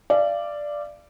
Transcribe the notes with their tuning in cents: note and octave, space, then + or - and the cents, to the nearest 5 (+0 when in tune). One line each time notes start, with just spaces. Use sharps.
D5 +0 F5 -35